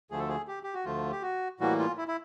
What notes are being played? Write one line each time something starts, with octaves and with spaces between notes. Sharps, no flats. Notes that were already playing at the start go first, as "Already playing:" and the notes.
D2 D3 F3 A3 G#4
A4
G#4
G4
G4
F#4
D2 D3 F3 A3 F4
G4
F#4
A2 E3 G3 A#3 F#4
F4
E4
E4